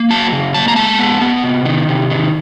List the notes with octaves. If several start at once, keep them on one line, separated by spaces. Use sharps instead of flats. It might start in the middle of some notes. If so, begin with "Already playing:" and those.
Already playing: A#3
F#3 A5
C#3
A#3 A5
A#5
G#3 A5
B3
B3
C3
D#3
C3
D#3